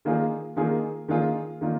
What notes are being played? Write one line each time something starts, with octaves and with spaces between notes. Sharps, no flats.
D#3 A#3 F4 G#4
D#3 A#3 F4 G#4
D#3 A#3 F4 G#4
D#3 A#3 F4